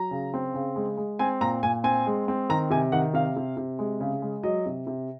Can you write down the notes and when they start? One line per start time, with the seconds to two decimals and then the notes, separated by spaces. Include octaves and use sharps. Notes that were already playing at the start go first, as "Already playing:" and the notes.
Already playing: F#3 A#5
0.11 C#3
0.34 C4
0.54 C#3
0.76 G#3
0.97 G#3
1.19 C4 G#5
1.41 A#2 A#5
1.63 A#2 G#5
1.84 C4 G#5
2.06 G#3
2.28 C4
2.49 D#3 A#5
2.70 C3 G#5
2.92 D#3 F#5
3.14 C3 F5
3.36 C3
3.57 C3
3.79 G#3
4.00 C#3
4.22 G#3
4.43 F#3 D#5
4.66 C3
4.87 C3